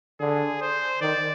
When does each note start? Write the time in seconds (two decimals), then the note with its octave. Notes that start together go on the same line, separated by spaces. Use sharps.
0.20 D3 G#4
0.61 C5
1.01 D#3 D5